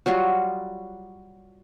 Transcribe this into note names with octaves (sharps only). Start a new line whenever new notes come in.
F#3 G3 F4 F#4